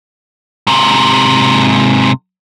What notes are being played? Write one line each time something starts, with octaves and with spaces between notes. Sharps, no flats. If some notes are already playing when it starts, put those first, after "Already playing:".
G#2 C3